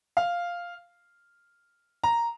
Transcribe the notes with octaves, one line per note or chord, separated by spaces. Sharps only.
F5
A#5